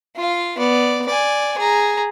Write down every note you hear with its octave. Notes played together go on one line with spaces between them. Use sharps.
F4 F5
B3 D5
D5 G#5
G#4 A#5